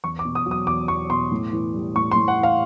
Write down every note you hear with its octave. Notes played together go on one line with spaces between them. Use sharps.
E2 C#6
D6
B2
D#6
F#3
D#6
E2 D6
E2 C#6
B2 C6
A2
E3
G3
A2 C#6
C6
A2
F#5
E3
F5